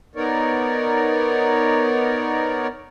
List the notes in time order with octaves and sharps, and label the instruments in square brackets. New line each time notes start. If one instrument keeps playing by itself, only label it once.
[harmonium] B3 D#4 A#4 C#5 D5